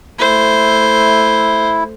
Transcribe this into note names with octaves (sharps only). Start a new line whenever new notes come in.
A3 E4 C5